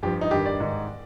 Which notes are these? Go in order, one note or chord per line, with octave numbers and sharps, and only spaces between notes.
G2 F3 G4
D#4
G2 D#3 G4
D5
G#2 D#3